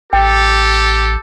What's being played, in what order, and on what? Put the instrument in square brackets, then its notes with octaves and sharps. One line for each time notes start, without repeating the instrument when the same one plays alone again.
[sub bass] A1 [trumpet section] G4 A4 [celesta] G5